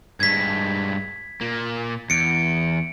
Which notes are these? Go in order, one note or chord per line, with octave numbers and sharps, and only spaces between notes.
G2 G#3 G#6 B6
A#2 A#3
E2 C#7 D7